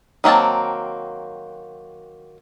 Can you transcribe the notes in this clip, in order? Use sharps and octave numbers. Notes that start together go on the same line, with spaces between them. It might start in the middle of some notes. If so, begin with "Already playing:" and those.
D#3 F#3 A#3 C4 A5